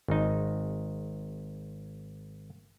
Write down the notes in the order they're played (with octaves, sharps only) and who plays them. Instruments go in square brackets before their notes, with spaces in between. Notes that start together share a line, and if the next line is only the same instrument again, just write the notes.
[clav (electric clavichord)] G#1 D#4